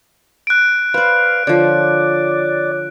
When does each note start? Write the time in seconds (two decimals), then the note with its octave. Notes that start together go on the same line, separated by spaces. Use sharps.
0.47 F#6 D7
0.94 B4 C5 D5 F5
1.47 D3 F3 C#5 D5 D6